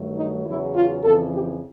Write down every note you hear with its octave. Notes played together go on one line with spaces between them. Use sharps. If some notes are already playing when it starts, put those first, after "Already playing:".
Already playing: G2 D#3 F#3 A3
D#4
E2 C#3 F#3 E4
F4
F2 C#3 E3 A4
G4